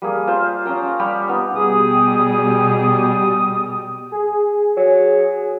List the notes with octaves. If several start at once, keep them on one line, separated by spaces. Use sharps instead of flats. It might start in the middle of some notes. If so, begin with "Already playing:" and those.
G3 A#3 G#4
F4 C5 F5
C#4 F5 G5 A#5
G3 G4 B5 C#6
B3 D#4 F4
B2 G3 G4 G#4 D#6
G#4
F#3